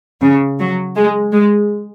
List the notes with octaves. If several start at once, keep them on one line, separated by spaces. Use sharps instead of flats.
C#3
F#3
G#3
G#3